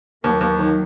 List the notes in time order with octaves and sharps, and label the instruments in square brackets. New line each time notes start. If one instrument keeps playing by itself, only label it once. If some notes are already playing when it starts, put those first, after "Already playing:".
[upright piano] D#2 [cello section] F#3 A#3
[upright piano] D#2
D#3